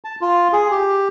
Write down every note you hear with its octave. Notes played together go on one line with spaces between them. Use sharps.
A5
F4
G#4
G4